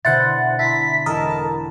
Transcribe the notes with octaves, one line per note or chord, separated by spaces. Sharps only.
B2 D3 E4 A4 C5 F#5 A6
E4 A5 A#5 C6 B6
E1 E4 A4 A#4 D#5 A5